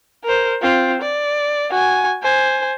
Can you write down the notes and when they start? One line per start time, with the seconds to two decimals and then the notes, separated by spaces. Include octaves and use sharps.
0.24 A#4 C5
0.62 C4 F4
1.02 D5
1.70 F#4 G#5
2.22 C5 G#5